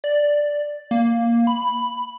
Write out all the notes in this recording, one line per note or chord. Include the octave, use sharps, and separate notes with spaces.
D5
A#3
B5